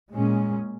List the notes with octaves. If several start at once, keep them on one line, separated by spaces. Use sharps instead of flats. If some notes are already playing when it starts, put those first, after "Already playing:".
A#2 G#3 C#4